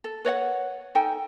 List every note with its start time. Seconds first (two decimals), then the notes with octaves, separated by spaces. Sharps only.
0.04 A4
0.25 B4 C#5 D5 F#5
0.95 D#4 A4 G5 G#5